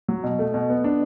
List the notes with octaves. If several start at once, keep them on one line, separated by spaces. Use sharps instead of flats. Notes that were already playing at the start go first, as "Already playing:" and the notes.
F#3
B2
A3
B2
B3
D4